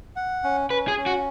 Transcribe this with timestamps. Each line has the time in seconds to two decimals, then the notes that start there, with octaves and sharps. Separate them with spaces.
0.16 F#5
0.44 C#4
0.70 C#4 B4
0.88 G#4
0.97 C#4
1.06 F#4